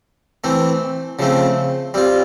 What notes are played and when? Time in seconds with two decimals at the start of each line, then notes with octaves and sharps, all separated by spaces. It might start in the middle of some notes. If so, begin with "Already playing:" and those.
0.44 E3 A3 C4
1.19 C#3 F3 A3 C4
1.94 G3 C4 F4